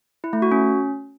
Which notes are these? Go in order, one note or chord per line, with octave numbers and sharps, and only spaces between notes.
E4
A3
F#4
C#4